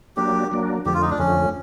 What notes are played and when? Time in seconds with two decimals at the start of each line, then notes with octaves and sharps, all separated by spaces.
0.17 F#3 A#3 D4 G4
0.52 F#3 A#3 D4
0.86 F2 D3 F3 A3 G4
0.94 F4
1.02 D#4
1.11 D4
1.19 F2 D3 F3 A3 C#4